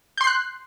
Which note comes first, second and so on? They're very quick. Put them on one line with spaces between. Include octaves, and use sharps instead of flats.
G6 C6 C7 F#6